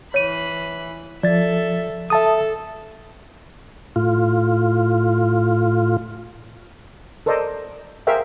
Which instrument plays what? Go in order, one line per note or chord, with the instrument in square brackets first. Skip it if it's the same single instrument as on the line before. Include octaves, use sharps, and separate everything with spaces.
[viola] E3 B5 [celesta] C#5 D#7
[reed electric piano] F3 A6 [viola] A4 E5 [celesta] D5
[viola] A4 [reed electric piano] E5 A5 D#6
[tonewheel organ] A2 F4
[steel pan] A4 A#4 C5 D5 D#5
G#4 A#4 C5 E5 F5 G5